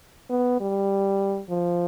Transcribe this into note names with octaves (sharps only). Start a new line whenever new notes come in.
B3
G3
F3